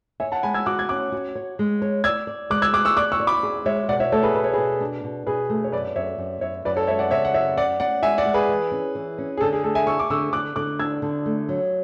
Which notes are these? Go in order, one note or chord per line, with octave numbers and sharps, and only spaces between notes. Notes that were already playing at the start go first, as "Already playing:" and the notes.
C#5 E5 G#5
F#5 A5
G#3 G#5 B5
E6 G#6
F#4 D6 F#6
G#6
C#4 D6 F#6
F#4
C#5
G#3
C#5
D5 E6 G#6
D5
G#3 D6 F#6
E6 G#6
G#4 D6 F#6
C#6 E6
D5 D6 F#6
C#6 E6
D5
B5 D6
G#4
G#3 C#5 E5
B2 D5 F#5
C#5 E5
A3 A4 C#5
G#4 B4
B2 B4
C#5
B2 G#4 B4
D4
B2
B2 G#4 B4
A3
C#5
F#2 B4 D5
F#2 C#5 E5
F#2
F#2 C#5 E5
F#2 B4 D5
A4 C#5
G#3 C#5 E5
D5 F#5
C#3 C#5 E5
F#5
F#2 C#5 E5
C#4 D5 F#5
C#4 D5 F#5
G#3 E5 G#5
D5 F#5
G#3
G#4 B4
E3
C#4
E3
C#4
G#4
D3 A4
G#4
A3 A4
E5 G#5
A3 C#6 E6
D6
D3 C#6 E6
D3 D6 F#6
D3 D6 F#6
D4 E6 G#6
D3
A3
F#3